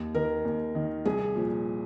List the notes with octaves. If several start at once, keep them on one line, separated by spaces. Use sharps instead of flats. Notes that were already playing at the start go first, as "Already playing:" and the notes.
Already playing: D#2
D#3 A#4
D#2
D#3
C2 G#4
A#2 F3